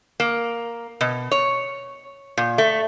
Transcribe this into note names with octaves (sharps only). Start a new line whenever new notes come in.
A#3
B2
C#5
A#2
A3